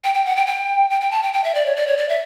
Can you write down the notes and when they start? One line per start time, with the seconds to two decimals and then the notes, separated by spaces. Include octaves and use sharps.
0.04 G5
0.15 G5
0.25 F#5
0.36 G5
0.47 G5
0.90 G5
1.01 G5
1.11 A5
1.23 G5
1.34 G5
1.44 E5
1.55 D5
1.66 C#5
1.76 D5
1.87 C#5
1.97 D5
2.09 E5